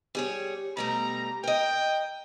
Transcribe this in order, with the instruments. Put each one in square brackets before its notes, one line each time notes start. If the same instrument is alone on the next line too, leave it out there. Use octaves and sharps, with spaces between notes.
[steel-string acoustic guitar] G3 G#4 C#5
[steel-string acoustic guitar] B2 G3 A3 [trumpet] A#5
[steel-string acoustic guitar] A#4 D#5 [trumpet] G5